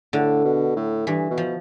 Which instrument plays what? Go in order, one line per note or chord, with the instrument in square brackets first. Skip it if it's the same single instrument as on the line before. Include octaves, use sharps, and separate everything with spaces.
[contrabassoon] A2 [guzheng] D3
[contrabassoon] B2
A2
[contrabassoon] G2 [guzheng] E3
[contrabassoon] B2
[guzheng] F3